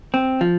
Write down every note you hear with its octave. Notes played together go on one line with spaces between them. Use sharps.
C4
F3